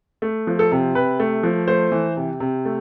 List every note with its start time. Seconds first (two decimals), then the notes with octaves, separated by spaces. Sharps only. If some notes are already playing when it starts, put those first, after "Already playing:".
0.22 A3
0.47 F3
0.59 A4
0.72 C3
0.95 C3 B4
1.20 A3
1.43 F3
1.68 A3 C5
1.92 E3
2.17 C3
2.40 C3
2.65 A3